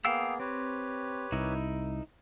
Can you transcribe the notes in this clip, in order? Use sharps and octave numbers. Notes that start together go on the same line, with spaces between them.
A#3 B3 G#4 F5 G5 E6
C4 G4 B4 C#5
C2 D#4 E4 A#4